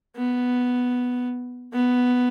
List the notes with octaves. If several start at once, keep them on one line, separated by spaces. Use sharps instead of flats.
B3
B3